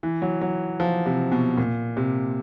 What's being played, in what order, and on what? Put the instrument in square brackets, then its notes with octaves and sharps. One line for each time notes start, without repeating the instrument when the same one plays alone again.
[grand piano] E3
F#3
F#3
F3
C3
B2
A#2
C3